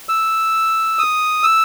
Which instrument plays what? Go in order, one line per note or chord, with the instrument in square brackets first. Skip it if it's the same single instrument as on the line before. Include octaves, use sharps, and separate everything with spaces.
[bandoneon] E6
D#6
E6